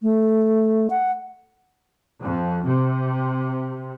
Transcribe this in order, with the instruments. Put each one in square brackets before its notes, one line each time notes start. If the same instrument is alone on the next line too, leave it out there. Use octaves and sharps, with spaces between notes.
[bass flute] A3
F#5
[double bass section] F2
C3